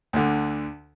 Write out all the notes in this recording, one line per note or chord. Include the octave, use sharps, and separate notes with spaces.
D2 D3